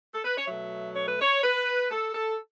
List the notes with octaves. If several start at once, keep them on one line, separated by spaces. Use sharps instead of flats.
A4
B4
C#5
B2 F#3 A3 E5
C#5
B4
C#5
B4
A4
A4